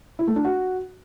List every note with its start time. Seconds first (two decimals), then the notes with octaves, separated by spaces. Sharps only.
0.19 E4
0.27 A3
0.36 D4
0.45 F#4